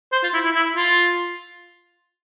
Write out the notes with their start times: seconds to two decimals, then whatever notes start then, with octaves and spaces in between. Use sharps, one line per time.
0.12 C5
0.23 F4
0.34 E4
0.45 E4
0.55 E4
0.77 F4